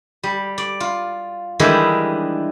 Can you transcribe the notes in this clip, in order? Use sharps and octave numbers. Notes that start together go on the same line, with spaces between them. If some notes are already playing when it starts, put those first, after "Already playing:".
G3
D5
F4
D#3 E3 G3 G#3 D4 E4